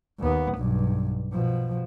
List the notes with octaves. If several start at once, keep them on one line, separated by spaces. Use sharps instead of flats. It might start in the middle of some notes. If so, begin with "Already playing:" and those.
D#2 B3
B1 G2
B2 F3